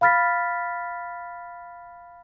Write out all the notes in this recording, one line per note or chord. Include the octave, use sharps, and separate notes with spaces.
F5 B5 F6 A6 B6